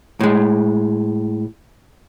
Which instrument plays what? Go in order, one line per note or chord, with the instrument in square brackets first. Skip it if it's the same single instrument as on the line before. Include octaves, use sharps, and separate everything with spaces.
[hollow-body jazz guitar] A2 G#3